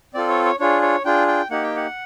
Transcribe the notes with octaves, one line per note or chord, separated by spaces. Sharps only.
C4 F4 A4 D5
C#5
C#5
D4 F4 G#4 C#5
C#5
D4 F4 G#4 G5
G5
A#3 D#4 G4 F#5
G5
F#5